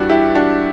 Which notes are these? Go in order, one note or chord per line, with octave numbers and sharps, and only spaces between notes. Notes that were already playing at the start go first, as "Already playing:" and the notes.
Already playing: G2 E3 G3 D4 F#4
E4 G4
D4 F#4